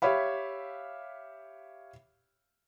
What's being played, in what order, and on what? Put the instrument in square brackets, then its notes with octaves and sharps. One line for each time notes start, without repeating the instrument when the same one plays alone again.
[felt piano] G4 C#5 E5 F5 B5